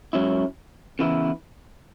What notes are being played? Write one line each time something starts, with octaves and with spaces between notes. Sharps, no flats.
G#2 F#3 C#4 E4
C#3 E3 B3 E4